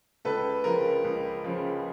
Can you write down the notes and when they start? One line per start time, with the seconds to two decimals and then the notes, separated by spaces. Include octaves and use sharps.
0.25 C#2 A4 B4
0.64 C#3 F3 A#4
1.04 C#2
1.44 C#3 F3